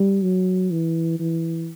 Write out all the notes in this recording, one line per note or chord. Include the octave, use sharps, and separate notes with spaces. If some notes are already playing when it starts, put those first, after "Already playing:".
Already playing: G3
F#3
E3
E3